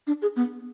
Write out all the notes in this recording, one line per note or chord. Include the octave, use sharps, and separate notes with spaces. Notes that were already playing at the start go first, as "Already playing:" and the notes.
D4
G#4
B3